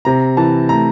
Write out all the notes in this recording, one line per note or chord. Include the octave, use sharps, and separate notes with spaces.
C3 A#5
E3 A5
A3 A#5